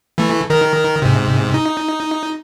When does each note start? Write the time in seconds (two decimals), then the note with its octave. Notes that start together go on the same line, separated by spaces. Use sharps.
0.18 E3 A3
0.50 D#3 A#4
1.02 G#2 C3
1.54 D#4